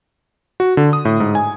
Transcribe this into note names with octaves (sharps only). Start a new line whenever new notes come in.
F#4
D3
D#6
A2
G#2
G#5